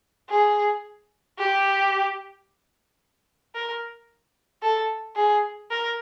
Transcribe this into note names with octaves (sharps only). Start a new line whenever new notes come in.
G#4
G4
A#4
A4
G#4
A#4